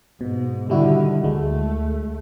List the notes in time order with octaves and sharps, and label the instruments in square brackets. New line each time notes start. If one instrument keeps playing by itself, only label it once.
[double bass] G#2 [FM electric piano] B2
[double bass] D3 D#3 [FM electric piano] G3 E4 F#4
[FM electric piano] D2 G#3 [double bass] A3